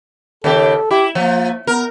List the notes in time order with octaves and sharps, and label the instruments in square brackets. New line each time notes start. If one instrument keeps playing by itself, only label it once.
[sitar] D#2 C#3 G4 [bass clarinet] A4
[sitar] E4 [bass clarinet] G4
[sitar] F3 [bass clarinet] A#3
[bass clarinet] B3 [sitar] A#4